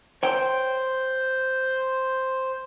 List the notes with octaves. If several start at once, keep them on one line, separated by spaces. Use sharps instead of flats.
C5 C#5 G5